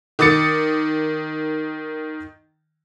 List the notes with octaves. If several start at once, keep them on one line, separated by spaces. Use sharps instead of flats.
D#3 D6 D#6 A6 C#7